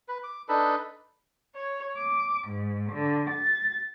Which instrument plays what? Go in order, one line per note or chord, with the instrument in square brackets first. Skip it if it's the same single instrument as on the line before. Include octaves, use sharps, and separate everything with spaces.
[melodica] B4
D6
D4 D#4 A4 B4
[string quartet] C#5
D6
G#2
D3
A6